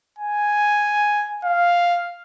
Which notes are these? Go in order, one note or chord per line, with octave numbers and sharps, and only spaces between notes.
G#5
F5